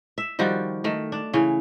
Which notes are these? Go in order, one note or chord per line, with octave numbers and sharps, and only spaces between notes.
E5
D#3 F3 G3 F#4
D#3 A3
D4
C#3 E3 C#4